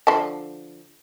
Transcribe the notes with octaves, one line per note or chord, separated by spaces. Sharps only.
D3 F3 A5